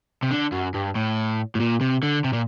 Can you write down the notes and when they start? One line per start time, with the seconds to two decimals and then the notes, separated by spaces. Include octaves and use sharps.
0.23 C3
0.31 D3
0.52 F#2
0.74 G2
0.95 A2
1.55 A2
1.60 A#2
1.81 C3
2.03 D3
2.24 C3
2.33 A#2